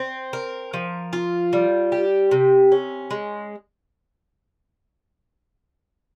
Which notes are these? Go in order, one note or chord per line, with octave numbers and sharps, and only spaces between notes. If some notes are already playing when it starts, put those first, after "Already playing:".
Already playing: C4
A#4
F3
F4
G3
G4
C3
C#4
G#3